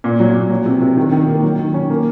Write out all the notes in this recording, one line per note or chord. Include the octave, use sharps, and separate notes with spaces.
A#2
F#3
A#2
F#3
C3
C3
D#3
D#3
A#3
F#3
D#3
C#4
A#3